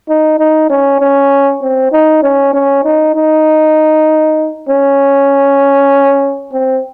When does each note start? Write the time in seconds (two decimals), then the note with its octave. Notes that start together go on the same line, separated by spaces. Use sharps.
0.08 D#4
0.39 D#4
0.70 C#4
1.00 C#4
1.62 C4
1.92 D#4
2.23 C#4
2.53 C#4
2.84 D#4
3.15 D#4
4.69 C#4
6.53 C4